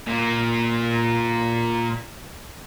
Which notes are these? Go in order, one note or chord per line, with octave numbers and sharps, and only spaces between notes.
A#2 A#3